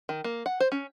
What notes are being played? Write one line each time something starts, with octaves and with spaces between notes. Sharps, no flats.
D#3
A#3
F#5
C5
C#4